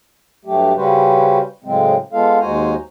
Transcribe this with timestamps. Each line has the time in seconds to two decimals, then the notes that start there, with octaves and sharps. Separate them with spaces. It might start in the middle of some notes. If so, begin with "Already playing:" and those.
0.45 G2 F#3 A3 G4
0.76 C#3 G3 C#4 F#4 B4 C5
1.64 A2 C#3 F#3 G#3 C4
2.13 G#3 B3 F4 A4 F5
2.40 D#2 G#3 F#4 C5 G#5 A#5